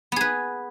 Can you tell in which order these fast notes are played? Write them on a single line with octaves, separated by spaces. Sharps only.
B3 G#4 B4